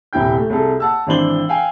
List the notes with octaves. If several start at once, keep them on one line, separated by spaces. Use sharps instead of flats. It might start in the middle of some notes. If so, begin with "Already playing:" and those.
D#1 C2 E4 G4 G5 G6
A3
C2 G#4 A4
F#5 A5 E6
G#1 E3 D4 C5 F#7 G7
F5 G5 G#5